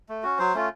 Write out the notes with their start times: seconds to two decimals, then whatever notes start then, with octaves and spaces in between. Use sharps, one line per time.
0.09 A3
0.23 C#4 F#4
0.39 F#3 C5
0.54 A3 C#4 F4